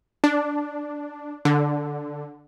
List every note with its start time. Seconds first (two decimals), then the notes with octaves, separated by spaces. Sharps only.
0.24 D4
1.45 D3